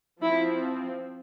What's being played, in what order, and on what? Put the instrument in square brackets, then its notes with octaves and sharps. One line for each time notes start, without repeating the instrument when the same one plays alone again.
[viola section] F3 C4 E4